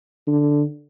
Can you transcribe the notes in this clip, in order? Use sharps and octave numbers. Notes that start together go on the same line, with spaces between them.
D3